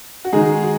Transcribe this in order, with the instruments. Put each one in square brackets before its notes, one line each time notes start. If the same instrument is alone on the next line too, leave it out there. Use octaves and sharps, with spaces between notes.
[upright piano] F#4
D#3 G#3 D#4 G#4
F#4